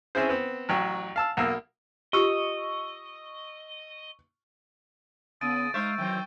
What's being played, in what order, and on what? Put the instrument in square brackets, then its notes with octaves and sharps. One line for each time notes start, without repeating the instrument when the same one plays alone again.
[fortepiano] C4 C#4 E4 G#4 C5
B3 C4
A1 F#3 G5
F5 A5 E6
B1 A#3 E6
[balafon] F4 G4 [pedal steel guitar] D#5 [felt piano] C#6 E6
[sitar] C#3 [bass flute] B3 [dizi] D#6 [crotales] A6 D7 D#7
[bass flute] G#3 [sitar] D#4 C5 E5 [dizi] F5 [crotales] C#6 G6 D7
[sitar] D#3 E3 C4 [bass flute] F#3 [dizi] G5